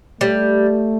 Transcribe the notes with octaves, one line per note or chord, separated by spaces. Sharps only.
G3 A3